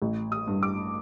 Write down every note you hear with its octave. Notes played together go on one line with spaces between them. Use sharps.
A1
D#6
G2
D6